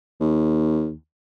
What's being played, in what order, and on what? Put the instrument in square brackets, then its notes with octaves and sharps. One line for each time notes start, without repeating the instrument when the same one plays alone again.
[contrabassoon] D#2